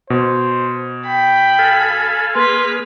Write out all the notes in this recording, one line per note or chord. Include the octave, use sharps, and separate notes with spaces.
B2 C5
G5 B5
A4 F5 G#5
A#3 G#4 B4 C6 F6 B6